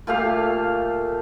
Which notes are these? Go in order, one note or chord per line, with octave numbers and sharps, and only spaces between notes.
A#2 A3 G4 F5